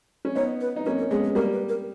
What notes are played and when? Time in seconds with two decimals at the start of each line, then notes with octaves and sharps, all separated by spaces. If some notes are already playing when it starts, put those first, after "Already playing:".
0.25 C#4
0.35 B3 D#4 C#5
0.61 B4
0.76 D#4
0.86 A#3 C#4 B4
0.98 A#4
1.11 G#3 B3 G#4
1.23 G#4
1.35 G3 A#3 A#4
1.53 B4
1.69 A#4